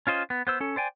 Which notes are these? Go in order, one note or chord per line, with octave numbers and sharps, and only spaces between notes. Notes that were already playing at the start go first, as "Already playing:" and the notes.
C#4 F4 C5 D#5
B3
B3 C5 E6
C#4 A4
C5 D5 G5 G#5